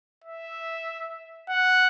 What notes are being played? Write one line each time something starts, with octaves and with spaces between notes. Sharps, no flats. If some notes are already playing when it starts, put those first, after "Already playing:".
E5
F#5